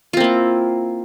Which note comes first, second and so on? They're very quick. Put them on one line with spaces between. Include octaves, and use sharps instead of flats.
F4 C4 A#3 E4